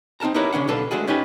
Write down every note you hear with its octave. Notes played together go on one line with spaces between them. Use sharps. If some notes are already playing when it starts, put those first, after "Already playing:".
C4 D#4 A#4 A5 A#5
D#4 E4 G4 A#4 B4 C#5
C#3 C#4 D4 F#5
B1 D3 A4 B4 F5
G#3 A3 D4 F#4 G#4
C#4 D#4 F4 G4 B4 G#5